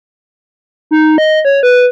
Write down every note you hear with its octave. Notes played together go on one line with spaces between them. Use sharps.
D#4
D#5
C#5
B4